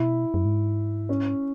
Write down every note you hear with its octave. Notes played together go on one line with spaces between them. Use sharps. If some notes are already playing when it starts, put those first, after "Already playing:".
Already playing: B2 E4
F#2
G#2
C#4